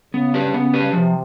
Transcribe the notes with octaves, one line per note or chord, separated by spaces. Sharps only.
C#3 B3
D4 G4 B4
C#3 B3
D4 G4 B4
C3 F3